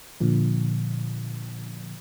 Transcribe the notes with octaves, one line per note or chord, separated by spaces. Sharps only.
A#2 D3 F3